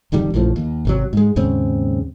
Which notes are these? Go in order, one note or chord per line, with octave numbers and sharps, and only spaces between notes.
D1 F2 D#3 G3
A#1 F#2 A2 F3
D#2
G#1 C3 F#3
G#2 G#3
D#2 G#2 C#3 C4